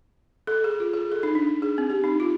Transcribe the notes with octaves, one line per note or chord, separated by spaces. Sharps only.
A4
G#4
F4
G#4
A4
D#4
D4
G#4
C4
G4
D#4
F4